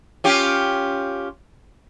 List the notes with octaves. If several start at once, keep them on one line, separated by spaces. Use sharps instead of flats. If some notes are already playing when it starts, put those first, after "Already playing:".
C#4 F4 G4